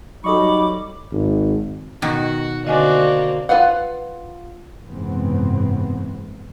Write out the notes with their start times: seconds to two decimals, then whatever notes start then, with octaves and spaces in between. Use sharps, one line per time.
0.24 F#3 G3 D#4 A4 D#5 B5 C#6 D6
1.12 G#1
2.02 B2 D#3 F#4
2.65 D3 A#3 C4 D4 F#4 D#5 G#5
3.49 F4 G#4 B4 F5 F#5
4.85 F#1 G#2 C3 E3 B3 C4